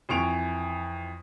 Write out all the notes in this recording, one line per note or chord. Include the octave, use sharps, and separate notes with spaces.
F2 E3 C#6 D7 F7